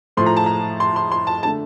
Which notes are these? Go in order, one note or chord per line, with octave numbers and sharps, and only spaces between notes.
A2 F3 A3 C6
A#5
A5
A#5
C6
C6
C6
A5
D3 A3 A5